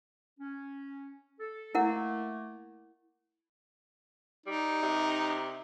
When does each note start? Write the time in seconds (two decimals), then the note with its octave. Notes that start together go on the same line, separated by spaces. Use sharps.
0.39 C#4
1.40 A4
1.75 A3 A#3 E4 A#4 F#5
4.46 G3 D#4
4.82 C3